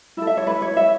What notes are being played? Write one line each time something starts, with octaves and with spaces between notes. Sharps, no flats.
E4 A4 E5
E5
C#5
B4
C#5
E5